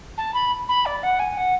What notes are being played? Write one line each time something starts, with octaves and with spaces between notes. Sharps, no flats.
A5
B5
B5
D5
F#5
G#5
F#5